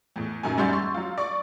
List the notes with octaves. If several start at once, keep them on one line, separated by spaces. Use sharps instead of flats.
E2 A2
F#2 A#2 D#3 G#5
F#2 G3 F#5 C6 G6 A6
C6 C#6 E6
F#3 F4
D5 C#6